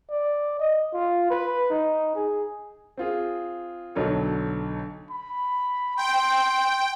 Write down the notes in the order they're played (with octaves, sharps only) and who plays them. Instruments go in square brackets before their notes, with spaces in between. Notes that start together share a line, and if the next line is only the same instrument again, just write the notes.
[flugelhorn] D5
D#5
F4
B4
D#4
G#4
[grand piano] C4 F4 G#4
B1 D3 F#3 A4 C#5
[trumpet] B5
[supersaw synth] G5 [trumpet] C6